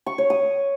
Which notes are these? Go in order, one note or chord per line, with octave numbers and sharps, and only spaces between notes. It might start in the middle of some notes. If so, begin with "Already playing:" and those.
C#6
C#5
D#6